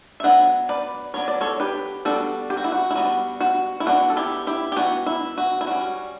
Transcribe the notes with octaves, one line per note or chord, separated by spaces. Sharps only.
E5
F#3 B3 D4 F#5
B4 D5
F#3 B3 D4 C#5
D5
A4 C#5
G4 B4
G3 B3 D4 F#4 A4
G4
F#4
E4
F#4
E4
G3 B3 D4 F#4
F#4
E4
E3 B3 D4 F#4
A4
E4 G4
E4 G4
G4
E3 B3 D4 F#4
E4
F#4
E4
G3 C#4 F#4